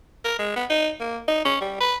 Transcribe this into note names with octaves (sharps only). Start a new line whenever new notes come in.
A#4
G#3
B3
D#4
A#3
D#4
C#4
G3
B4